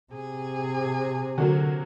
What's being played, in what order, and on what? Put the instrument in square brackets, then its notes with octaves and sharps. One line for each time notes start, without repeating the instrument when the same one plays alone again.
[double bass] C3 [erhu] G#4
[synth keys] D3 [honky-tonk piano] F#3 A#3 F#4